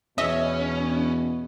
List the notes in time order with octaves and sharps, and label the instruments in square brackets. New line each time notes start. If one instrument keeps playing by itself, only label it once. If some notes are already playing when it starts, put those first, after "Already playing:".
[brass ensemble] E2 B2 [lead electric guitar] C#4 [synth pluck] D#5 E5